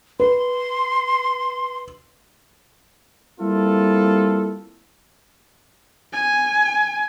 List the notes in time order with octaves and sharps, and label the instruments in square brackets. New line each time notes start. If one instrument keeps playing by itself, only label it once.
[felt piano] B4 [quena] C6
[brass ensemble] G3 A#3 C4 E4 F4 A4
[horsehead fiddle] G#5